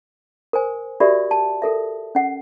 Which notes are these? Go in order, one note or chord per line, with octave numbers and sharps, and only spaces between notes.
A#4 C5 G#5
F#4 G4 A#4 D5 E5 B5
A5
A4 A#4 E5
C#4 F#5